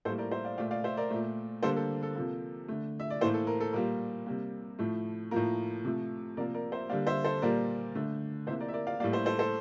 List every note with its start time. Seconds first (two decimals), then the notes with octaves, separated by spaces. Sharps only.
0.05 A2 G3 A#3 A4 C5
0.18 A#4 D5
0.31 C5 E5
0.45 D5 F5
0.58 A#2 A3 D5 F5
0.71 D5 F5
0.84 C5 E5
0.97 A#4 D5
1.10 A#2 A3
1.63 D3 G3 A#3 A4 C5
1.76 A4
2.03 A4
2.16 C3 F3 A#3 A4
2.68 D3 A3
3.00 E5
3.10 D5
3.21 A2 E3 A#3 A4 C5
3.34 A4
3.47 A#4
3.60 A4
3.73 A#2 G3 A#3 A#4
4.26 C3 G3 A#3
4.79 A2 F3 A3
5.31 A2 F3 A#3 A#4
5.84 C3 F3 A3
6.37 C3 F3 A#3 A#4 D5
6.54 A#4 D5
6.72 C5 E5
6.89 D3 G3 A#3 D5 F5
7.07 C5 E5
7.24 A4 C5
7.42 A#2 G3 A#3 A#4 D5
7.95 D3 A3
8.47 C3 E3 A#3 C5 E5
8.60 A#4 D5
8.68 E5
8.73 A#4 D5
8.87 D5 F5
9.00 A2 G3 A#3 D5 F5
9.13 C5 E5
9.26 A4 C5
9.39 A4 C5